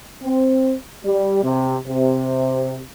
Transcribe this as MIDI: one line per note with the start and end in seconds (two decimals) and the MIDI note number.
0.22 0.74 60
1.04 1.41 55
1.42 1.77 48
1.86 2.78 48